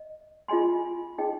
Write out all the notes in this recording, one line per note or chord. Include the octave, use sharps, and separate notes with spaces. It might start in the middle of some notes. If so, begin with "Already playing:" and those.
Already playing: D#5
F4 G#4 D#5 G#5 C6
D#4 G#4 D#5 G5